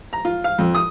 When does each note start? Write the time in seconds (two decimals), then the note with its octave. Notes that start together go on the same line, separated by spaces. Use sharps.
0.13 A#5
0.25 F4
0.44 F5
0.58 F2
0.75 D#6